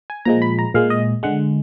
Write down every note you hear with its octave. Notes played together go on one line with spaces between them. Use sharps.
G#5
A#2 F3 G#3 A#5
B5
A#5
A#2 G#3 F5
D#5
D3 G#3 F#5